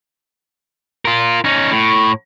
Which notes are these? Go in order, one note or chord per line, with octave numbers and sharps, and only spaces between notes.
F4 A#4
C#4 D#4
A2